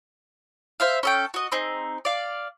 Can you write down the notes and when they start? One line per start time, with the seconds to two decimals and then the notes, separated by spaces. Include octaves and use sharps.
0.80 C5 E5 F5
1.03 C#4 A4 G5
1.34 F#4 D#5
1.52 C4 D#4 G#4
2.05 D5 F5